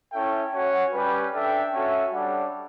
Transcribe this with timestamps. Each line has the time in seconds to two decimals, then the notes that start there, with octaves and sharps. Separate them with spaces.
0.12 C#4 E4 A4 E5 G5
0.52 C#4 F#4 C#5 F#5
0.92 G3 C#4 G4 B4
1.32 D4 A4 E5 G5
1.73 C#4 F#4 A4 E5
2.12 G3 D4 A4 C#5 F#5